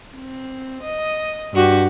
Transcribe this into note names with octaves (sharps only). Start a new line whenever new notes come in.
C4
D#5
G2 F#4 G4